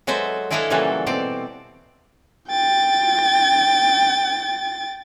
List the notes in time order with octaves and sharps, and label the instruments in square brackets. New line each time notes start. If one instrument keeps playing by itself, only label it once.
[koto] F#3 G#3 A4 B4 C5 E5
G#3 D4 E4 A4 D#5 F5
A#2 C#3 E3 F#3 G3 A4
B2 C4 D5
[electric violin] G5 A6